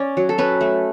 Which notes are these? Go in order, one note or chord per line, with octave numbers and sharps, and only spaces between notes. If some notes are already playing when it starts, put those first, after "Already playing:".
Already playing: C#4 D5
F#3
A4
C#4 B4
A3